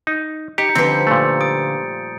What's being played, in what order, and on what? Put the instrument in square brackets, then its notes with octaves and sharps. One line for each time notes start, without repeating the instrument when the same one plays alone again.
[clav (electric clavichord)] D#4
[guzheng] D#4 [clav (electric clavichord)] G4 [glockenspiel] A#5 G6 C#7
[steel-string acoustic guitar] D3 B4 [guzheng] F3 G3 G4 [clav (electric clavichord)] C4
[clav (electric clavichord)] A#2 A3
[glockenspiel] D#6 A6 D7